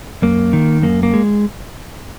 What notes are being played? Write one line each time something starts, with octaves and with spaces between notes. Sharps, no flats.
F#2 A#3
D#3
F#2 A#3
A#3
G#3